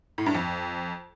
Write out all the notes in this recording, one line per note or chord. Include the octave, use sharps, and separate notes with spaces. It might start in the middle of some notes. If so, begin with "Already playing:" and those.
A2
G2
F2